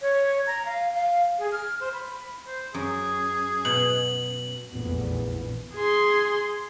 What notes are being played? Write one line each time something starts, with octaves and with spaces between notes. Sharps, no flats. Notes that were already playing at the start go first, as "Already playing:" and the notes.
C#5
A#5
F5
F5
G#4
F6
C5
B5
C5
F#2 G#4
B2 F#7
F1 A#1 E2 A#2 B3
G#4 C6